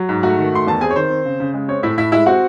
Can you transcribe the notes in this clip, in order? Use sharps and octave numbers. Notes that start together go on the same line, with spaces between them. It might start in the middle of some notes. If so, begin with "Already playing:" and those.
Already playing: F#3
G#2
A3 F#4 F#5
D#3
A3 C6
E2 A5
C4 G#4 G#5
C#5
D#3 C5
C4
C#3
C#3
G#3
C4 C#5
A2 E4 E5
A2 E4 E5
G#3 E4 E5
C4 F#4 F#5